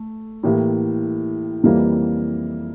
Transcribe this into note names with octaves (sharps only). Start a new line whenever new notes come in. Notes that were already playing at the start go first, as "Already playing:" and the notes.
Already playing: A3
A2 E3 A#3 E4 G4
F2 E3 G3 A#3 E4